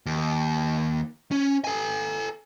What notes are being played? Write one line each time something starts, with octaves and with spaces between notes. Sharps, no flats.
D#2
C#4
A4 G#5